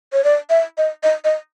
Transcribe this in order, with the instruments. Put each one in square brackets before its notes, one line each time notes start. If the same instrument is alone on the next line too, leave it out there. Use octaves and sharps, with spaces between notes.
[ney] C#5
D5
E5
D#5
D#5
D#5